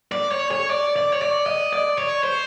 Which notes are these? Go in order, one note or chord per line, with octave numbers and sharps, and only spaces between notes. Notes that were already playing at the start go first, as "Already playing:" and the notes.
D5
C#5
C#5
D5
D5
C#5
D5
D#5
D5
C#5
C5